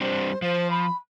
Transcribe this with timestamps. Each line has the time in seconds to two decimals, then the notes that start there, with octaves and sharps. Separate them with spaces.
0.01 G3 C4 D4 C5
0.42 F3 C5
0.70 B5